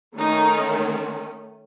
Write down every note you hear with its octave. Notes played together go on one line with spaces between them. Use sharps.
D#3 A3 C#4 D#4